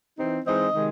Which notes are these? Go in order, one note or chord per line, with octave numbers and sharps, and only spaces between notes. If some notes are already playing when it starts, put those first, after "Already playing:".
E3 C4 D#4
E3 G#3 C4 D#4 D#5
C3 D#3 G#3 D#4